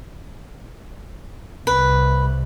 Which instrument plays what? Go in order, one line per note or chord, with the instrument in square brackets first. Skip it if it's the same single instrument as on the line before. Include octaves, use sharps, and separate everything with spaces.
[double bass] C2 [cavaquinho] B4